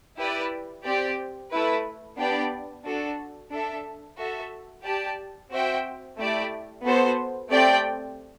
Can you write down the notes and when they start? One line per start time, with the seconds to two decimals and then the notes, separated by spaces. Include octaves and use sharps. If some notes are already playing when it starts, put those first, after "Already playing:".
0.17 E4 G4 B4 D5
0.84 C4 G4 D5
1.50 A3 E4 B4
2.17 B3 D4 G4 D5 G5
2.84 D4 F#4 A4
3.51 D4 A4 E5
4.17 F#4 A4 E5
4.84 G4 D5 A5
5.50 C4 F#4 C5 E5 G5
6.17 A3 E4 G4 D5
6.85 B3 F#4 A4 C5
7.51 A3 C4 G4 D5 G5